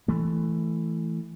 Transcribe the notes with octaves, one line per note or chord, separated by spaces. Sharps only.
E3 A3